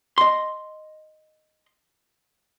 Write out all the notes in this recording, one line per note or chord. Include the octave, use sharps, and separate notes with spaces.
D#5 C6